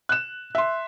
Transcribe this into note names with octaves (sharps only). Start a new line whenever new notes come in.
F#6 E7
E5 C6